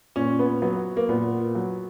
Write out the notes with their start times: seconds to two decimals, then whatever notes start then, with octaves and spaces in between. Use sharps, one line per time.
0.16 A#2 C#4
0.39 B3
0.62 F#3 B3
0.97 A#3
1.09 A#2 B3
1.55 F#3